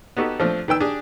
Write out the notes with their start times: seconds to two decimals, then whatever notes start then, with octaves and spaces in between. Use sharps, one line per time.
0.17 B3 D#4 F#4 G4 A4
0.40 F3 A3 C4 D4
0.68 D#3 B4 G5 E6
0.80 D4 G4 G#4